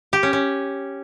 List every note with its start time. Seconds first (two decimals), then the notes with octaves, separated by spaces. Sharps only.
0.13 G4
0.23 C#4
0.33 C#4